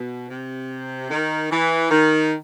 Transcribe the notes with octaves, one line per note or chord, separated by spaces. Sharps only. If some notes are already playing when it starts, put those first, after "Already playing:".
Already playing: B2
C3
D#3
E3
D#3